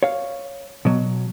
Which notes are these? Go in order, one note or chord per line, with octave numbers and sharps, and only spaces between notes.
C#5 F5
B2 F#3